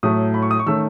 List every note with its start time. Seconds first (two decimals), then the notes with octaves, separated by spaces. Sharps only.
0.03 A2 F#3 A3 D#6
0.34 B5
0.42 C#6
0.51 D#6
0.59 C#6
0.66 D#3 A3 C#4 E6